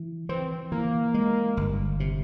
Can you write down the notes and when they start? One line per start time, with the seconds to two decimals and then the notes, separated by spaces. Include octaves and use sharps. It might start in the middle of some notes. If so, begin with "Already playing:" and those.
Already playing: E3
0.29 E3 C4
0.72 E3 A#3
1.14 G#3
1.57 G1
2.00 C3